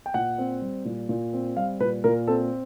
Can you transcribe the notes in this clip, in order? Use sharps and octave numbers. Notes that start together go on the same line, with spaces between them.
G5
A#2 F#5
C4
G3
A#2
A#2
C4
G3 F5
A#2 B4
A#2 A#4
C4 A4